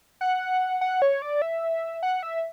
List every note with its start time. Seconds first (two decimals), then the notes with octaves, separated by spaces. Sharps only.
0.21 F#5
0.81 F#5
1.02 C#5
1.22 D5
1.42 E5
2.03 F#5
2.23 E5